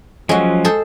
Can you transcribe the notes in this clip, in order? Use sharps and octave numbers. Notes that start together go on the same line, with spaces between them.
F3 F#3 G#3 C#4 F#4
G#4 A4 C5